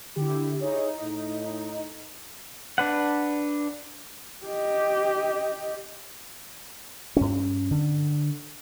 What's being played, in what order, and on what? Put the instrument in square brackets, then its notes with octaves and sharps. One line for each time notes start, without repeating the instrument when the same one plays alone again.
[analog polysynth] D3 E4 [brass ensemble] G4
[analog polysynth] D#4 [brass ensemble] E4 G#4 C#5
[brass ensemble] A2
[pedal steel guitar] D4 B4 F#5
[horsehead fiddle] G4 D#5
[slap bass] G2 C#4
D3